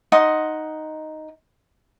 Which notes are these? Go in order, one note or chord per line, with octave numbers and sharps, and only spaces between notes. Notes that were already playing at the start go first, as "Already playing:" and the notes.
D#4 F#5 C6 D#6